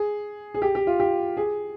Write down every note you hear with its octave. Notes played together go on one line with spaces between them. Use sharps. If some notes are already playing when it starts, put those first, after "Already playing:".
Already playing: G#4
G#4
G4
G4
F4
G4
G#4